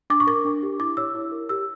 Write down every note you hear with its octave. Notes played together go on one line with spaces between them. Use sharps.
D4 D6
C#6
A#4 D6
D4
G4
E4 D6
C#5 E6
E4
A#4
G4 E6